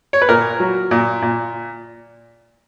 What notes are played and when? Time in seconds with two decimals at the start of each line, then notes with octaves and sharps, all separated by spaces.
0.13 C#5
0.22 B4
0.29 A#2 A#4
0.60 F#3
0.91 A#2
1.22 A#2